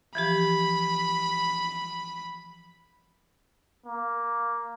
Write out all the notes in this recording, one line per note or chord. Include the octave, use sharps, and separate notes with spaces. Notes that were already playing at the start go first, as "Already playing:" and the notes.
E3 F3 G4 B5
A#3